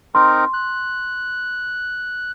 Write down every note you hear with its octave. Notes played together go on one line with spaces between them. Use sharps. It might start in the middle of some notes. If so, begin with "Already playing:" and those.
C4 D#4 A#4 C6
F#6